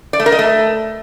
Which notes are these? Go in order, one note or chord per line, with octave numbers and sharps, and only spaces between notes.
D5
A3
A#4
D#5
A3